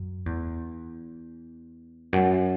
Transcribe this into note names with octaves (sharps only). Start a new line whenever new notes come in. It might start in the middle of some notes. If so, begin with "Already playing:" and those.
Already playing: F#2
E2
F#2